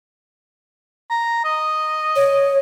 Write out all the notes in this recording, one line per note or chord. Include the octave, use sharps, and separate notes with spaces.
A#5
D#5
C#5